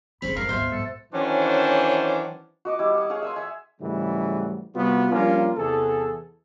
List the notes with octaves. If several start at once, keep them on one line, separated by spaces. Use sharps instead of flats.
F#1 C#2 C4 C#4 G#4 B5
A#2 G#3 D4 A#4 F5
G#1 D2 B2 B3 C5 E5
G#2 F3 A4
D#3 E3 F#3 C#4 D4 C5
F#4 D#5 D6
G3 E4
F#5 D#6
G#4 C#5 F5 F#5
E5 G#5 C6
E5 G#5
G#2 C#3 E3 F#3 G3 A3
C3 G3 B3 F4 F#4
F3 G3 A#3 C#4 D4 F4
E2 C3 E3 G#4 A4